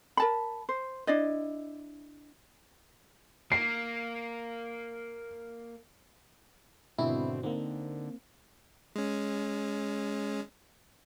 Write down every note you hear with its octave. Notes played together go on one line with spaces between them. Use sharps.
A#4 A5 B5
C5
D4 E4 D5 D#5
A#3 C7
G#1 B2 D3 C4 E4
D3 A#3 C4 D#4
G#3 C#4